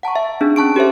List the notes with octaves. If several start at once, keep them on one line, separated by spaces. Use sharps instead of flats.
F#5 A5 A#5 C#6
E5
C4 D4 D#4 G#4
C#4 A5 C#6 D7
G4 A4 C5 E5